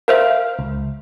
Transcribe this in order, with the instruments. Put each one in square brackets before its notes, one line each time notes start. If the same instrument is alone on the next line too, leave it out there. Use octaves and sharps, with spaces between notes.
[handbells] A#4 C5 E5 [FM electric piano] F5
[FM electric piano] C#2